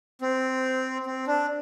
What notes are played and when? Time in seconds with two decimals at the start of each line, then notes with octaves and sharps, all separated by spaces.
0.22 C4
1.06 C4
1.27 D4